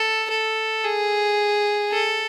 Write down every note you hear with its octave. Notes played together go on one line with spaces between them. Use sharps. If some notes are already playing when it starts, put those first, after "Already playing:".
Already playing: A4
A4
G#4
A4